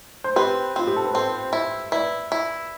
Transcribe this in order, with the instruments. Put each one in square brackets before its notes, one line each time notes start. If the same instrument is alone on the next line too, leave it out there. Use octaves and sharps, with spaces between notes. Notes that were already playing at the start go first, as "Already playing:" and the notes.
[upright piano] C5
[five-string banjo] C4 [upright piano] G4 B4
[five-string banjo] C4 [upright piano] F4
[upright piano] G4
A4
B4
[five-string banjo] C4 [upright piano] A4 C5
[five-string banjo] E4
[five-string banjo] E4 [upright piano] B4 D5
[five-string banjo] E4